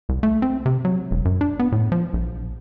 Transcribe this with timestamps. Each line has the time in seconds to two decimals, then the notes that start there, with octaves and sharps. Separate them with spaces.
0.09 C2
0.23 A3
0.42 C4
0.66 C3
0.85 F#3
1.11 E1
1.25 F#2
1.41 D4
1.59 B3
1.72 A2
1.92 F3
2.14 A#1